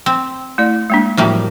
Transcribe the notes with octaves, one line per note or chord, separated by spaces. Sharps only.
C4
A3 E4 D5
G#3 A#3 D4
A2 E3 F3 G3 A#3 F#4